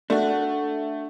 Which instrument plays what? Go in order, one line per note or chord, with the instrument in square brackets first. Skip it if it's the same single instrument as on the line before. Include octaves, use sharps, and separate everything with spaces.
[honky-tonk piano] A3 [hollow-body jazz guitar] D4 F#4